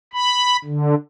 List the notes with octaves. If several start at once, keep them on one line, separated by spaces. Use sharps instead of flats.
B5
D3